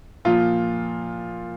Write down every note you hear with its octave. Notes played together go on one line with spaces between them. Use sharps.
A#2 F3 F4